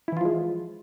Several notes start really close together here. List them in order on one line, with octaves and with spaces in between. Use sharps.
E4 E3 F4 F3 G#3